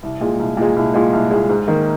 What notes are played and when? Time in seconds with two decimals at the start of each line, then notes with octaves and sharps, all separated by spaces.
0.03 C2
0.21 A#2 G#3
0.39 C2
0.57 A#2 G#3
0.76 C2
0.94 A#2 G#3
1.13 C2
1.31 A#2 G#3
1.49 G#2
1.68 D#3 A#3